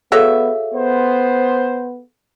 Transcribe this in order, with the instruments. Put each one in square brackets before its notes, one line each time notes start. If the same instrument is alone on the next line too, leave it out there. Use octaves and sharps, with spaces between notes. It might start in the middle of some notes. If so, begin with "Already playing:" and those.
[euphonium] B3 [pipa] F#4 C#5 E5 [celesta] G#4 A4 F5
[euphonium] B3 [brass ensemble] C5